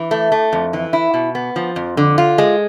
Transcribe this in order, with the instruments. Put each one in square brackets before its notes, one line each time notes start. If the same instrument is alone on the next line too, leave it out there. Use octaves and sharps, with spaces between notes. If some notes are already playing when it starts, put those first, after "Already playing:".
Already playing: [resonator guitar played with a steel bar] E3
A3
A3
F2
E3
E4
B2
B3
F3
F2
D3
F4
G#3